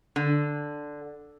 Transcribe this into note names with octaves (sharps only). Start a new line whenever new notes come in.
D3